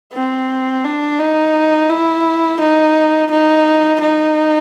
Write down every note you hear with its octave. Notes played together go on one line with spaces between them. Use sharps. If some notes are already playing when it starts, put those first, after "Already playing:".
C4
D4
D#4
E4
D#4
D#4
D#4